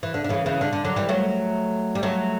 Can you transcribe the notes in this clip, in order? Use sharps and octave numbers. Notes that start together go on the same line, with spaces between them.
E3
D3
D3
C#3 E3
C#3 E3
D3
D3
D3 F#3
E3 G3
F#3 A3
G3
F#3 A3